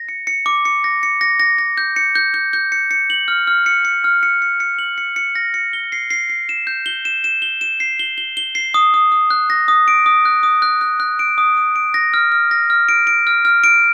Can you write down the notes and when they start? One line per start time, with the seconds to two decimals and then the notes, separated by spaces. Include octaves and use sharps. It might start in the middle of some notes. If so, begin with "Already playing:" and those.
Already playing: A#6
0.09 C#7
0.27 C#7
0.46 D6
0.65 C#7
0.84 A#6
1.03 C#7
1.21 A#6
1.40 A#6
1.58 A#6
1.78 G6
1.96 C#7
2.15 G6
2.34 G6
2.53 G6
2.72 C#7
2.91 C#7
3.10 F#7
3.28 F6
3.47 F6
3.66 C#7
3.85 C#7
4.04 F6
4.23 C#7
4.42 C#7
4.60 C#7
4.79 F#7
4.98 C#7
5.16 C#7
5.36 A#6
5.54 C#7
5.73 G7
5.92 C7
6.11 C7
6.29 C7
6.49 E7
6.67 G6
6.86 G7
7.05 E7
7.24 E7
7.42 G7
7.61 E7
7.80 C7
7.99 G7
8.18 G7
8.37 G7
8.55 C7
8.74 D#6
8.94 D#6
9.12 D#6
9.31 F#6
9.50 A#6
9.68 D#6
9.88 D7
10.06 D#6
10.25 F#6
10.43 D#6
10.62 F#6
10.81 F#6
11.00 F#6
11.19 D7
11.38 D#6
11.57 D#6
11.76 D7
11.94 A#6
12.14 F6
12.32 F6
12.51 A#6
12.70 F6
12.89 D7
13.07 D7
13.27 F6
13.45 F6
13.64 D7